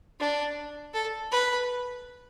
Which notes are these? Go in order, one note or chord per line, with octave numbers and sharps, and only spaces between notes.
D4
A4
B4